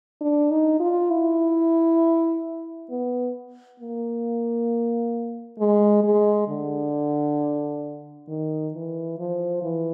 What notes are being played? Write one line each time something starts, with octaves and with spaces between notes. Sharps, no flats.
D4
D#4
F4
E4
B3
A#3
G#3
G#3
D3
D#3
E3
F3
E3